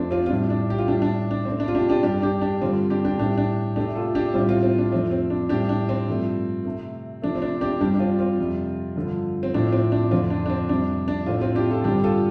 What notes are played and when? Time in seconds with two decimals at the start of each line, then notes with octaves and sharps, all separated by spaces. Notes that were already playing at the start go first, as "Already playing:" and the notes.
Already playing: F2 F3 A3 C4 D4
0.11 C4 F4
0.26 F4
0.30 A2 G3 D4
0.50 D4
0.70 G4
0.78 F4
0.88 A2 G3 D4
1.02 D4
1.31 D4
1.45 C3 A3 C4
1.60 D4
1.68 F4
1.75 D4 G4
1.89 D4 G4
2.03 G2 G3 D4 G4
2.22 D4 G4
2.41 D4 G4
2.61 G2 D3 G3 C4 F4
2.90 D4 G4
3.05 D4 G4
3.18 A2 G3 D4 G4
3.38 D4
3.76 C3 A3 D4 G4
3.95 F4 A4
4.15 D4 G4
4.34 A2 G3 C4 F4
4.49 C4 F4
4.63 C4
4.78 D4
4.92 F2 F3 A3 C4
5.11 C4
5.30 D4
5.49 A2 G3 D4 G4
5.69 D4
5.89 C4
6.08 G2 F3 A3
6.65 C3 A3
7.22 C3 F3 A3 D4
7.35 C4
7.42 D4
7.61 D4 G4
7.80 G2 G3 D4 G4
7.95 D4
7.99 C4 F4
8.19 C4 F4
8.38 F2 C3 G3
8.96 G2 D3 F3
9.43 C4
9.53 A2 F3 A3 D4
9.72 C4
9.92 D4
10.11 F2 D3 F3 C4 F4
10.30 D4
10.46 D4
10.50 C4
10.69 F2 C3 G3 D4
11.08 D4
11.26 A2 F3 A3 C4 F4
11.41 C4 F4
11.55 D4 G4
11.70 F4 A4
11.84 G2 D3 G3 D4 G4
12.04 F4 A4